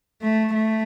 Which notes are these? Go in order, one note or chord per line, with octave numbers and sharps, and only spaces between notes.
A3
A3